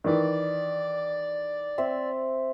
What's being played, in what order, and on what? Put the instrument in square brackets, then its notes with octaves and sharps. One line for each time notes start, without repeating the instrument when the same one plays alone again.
[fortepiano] D#3 E3 [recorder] D5
[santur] C4 E5